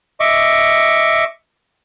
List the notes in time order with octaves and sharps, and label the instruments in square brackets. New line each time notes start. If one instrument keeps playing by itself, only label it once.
[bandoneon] D#5 E5 C#6 D6